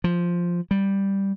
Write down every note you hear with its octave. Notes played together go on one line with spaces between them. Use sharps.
F3
G3